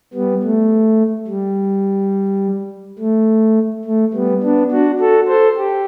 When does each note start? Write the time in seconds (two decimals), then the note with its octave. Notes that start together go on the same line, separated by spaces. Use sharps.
0.14 G3 B3
0.43 A3
1.27 G3
2.99 A3
3.85 A3
4.13 G3 B3
4.43 B3 D4
4.71 D4 F#4
5.00 F#4 A4
5.28 A4 C5
5.57 G4